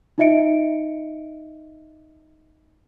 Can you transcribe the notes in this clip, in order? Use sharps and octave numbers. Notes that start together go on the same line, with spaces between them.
D#4 F4 D#5 E5 C#7 D7